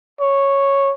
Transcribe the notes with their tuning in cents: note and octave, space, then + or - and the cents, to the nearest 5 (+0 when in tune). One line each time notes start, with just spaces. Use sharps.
C#5 -5